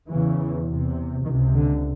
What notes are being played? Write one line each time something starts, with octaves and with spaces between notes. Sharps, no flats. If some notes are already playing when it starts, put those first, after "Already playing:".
E2 C#3 E3
E2 C3
C#2 D#3
C3
D3